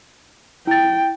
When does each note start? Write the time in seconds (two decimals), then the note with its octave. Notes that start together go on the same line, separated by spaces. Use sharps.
0.67 E4 G5 A6